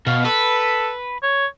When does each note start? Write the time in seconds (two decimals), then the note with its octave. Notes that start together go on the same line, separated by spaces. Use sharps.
0.07 B2 F5
0.25 A4 B4
1.23 C#5